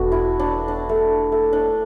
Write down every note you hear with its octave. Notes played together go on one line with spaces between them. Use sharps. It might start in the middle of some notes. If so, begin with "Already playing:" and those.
Already playing: E1 A3 B3 D4 F#4
E4
D4
D4
A3
A3
D4